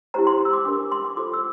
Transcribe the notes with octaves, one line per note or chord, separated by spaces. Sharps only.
E4 G4 C5 A#5
C6
E6
D6
D4 G4 A#4 D6
D6
C6
D6
F4 A4 C5 D6
E6